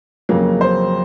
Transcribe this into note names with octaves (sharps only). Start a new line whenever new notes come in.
F2 C#3 F#3 A#3 C#4
C5